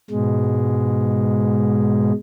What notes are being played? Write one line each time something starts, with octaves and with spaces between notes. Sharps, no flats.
G#2 B2 G#3